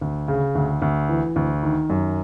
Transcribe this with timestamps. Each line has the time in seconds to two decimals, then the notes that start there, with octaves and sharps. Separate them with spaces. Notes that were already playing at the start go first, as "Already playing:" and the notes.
0.01 D2
0.28 C#3
0.55 D2
0.82 D2
1.09 E3
1.36 D2
1.63 D#3
1.90 F#2